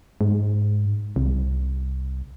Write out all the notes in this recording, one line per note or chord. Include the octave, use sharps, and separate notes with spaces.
G#2
C2